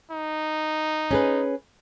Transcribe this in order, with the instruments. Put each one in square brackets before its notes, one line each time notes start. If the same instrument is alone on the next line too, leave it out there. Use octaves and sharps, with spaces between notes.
[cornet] D#4
[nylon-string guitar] C#4 G#4 B4